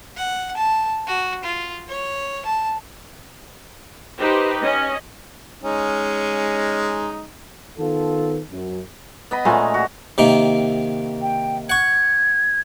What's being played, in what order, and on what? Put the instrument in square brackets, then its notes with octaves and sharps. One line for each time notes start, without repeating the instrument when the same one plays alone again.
[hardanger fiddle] F#5
A5
F#4
F4
C#5
A5
[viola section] D#4 G4 B4 C5
C#4 D#5
[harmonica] G#3 C#4 D#4
[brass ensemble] D#3 B3 F4 A4
F#2
[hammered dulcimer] B3 D#5 B5
[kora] A#2 G#3 A3 [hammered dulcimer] C#4 G#4 A#4
[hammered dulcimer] F#4
[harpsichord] C3 D#3 A#3
[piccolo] G5
[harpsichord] F#5 C#6 [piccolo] G#6